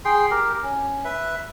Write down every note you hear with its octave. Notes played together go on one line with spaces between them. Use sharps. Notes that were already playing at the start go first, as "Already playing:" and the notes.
G#4 G5 C6
G4 A#4
C#4
B4 E5